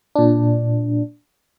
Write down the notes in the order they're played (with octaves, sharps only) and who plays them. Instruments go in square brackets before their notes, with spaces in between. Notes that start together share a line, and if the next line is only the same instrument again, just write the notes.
[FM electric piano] A#2 D4